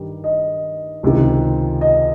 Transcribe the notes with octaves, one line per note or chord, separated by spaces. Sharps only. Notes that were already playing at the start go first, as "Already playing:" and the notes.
Already playing: G2 D#3 G3
D#5
C#2 C3 D#3
D#5